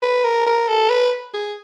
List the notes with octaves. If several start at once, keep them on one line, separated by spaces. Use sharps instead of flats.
B4
A#4
A#4
A4
B4
G#4